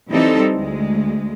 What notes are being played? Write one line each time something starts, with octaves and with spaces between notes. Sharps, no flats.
E3 G3 C4 D#4 A4
D2 G#3